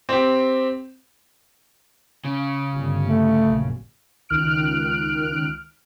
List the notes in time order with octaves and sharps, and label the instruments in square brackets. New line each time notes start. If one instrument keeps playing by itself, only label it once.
[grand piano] C4 G4
[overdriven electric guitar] C#3
[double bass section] G1 G3
[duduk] A3
[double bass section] A#1 F#2
[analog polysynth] C#2 D#3 F6 F#6 D7